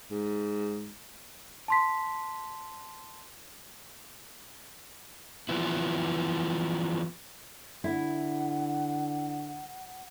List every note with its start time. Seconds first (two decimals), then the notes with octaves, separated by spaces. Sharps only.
0.11 G#2
1.68 A5 C6 B6
5.49 E3 F3 B3 E4
7.84 D3 E4 F#5